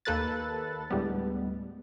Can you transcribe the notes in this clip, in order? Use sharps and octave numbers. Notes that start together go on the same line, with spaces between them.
D#2 A#3 A4 B4 F#6 A6
D2 A2 G3 G#3 B3